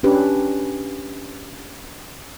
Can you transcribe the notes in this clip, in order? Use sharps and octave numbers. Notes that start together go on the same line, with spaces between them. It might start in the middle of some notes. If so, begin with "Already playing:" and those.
C#4 D4 G4 B4